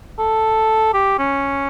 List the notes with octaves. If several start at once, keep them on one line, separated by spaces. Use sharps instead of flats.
A4
G4
C#4